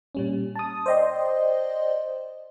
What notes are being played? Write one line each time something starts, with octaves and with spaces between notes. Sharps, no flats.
A#2 G3 C#4
A5 D#6
C5 D5 D#5 G5 C6